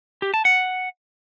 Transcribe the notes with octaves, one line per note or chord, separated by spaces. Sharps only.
G4
A5
F#5